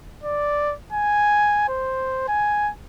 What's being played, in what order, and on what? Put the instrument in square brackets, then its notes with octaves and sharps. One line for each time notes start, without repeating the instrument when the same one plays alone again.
[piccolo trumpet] D5
G#5
C5
G#5